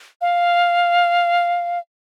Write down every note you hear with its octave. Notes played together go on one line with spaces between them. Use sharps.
F5